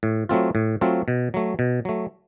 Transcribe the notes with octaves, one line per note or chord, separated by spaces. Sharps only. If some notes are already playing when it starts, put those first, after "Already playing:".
A2
F#3 A3 C4 F4
A2
F#3 A3 C4 F4
B2
F#3 A3
B2
F#3 A3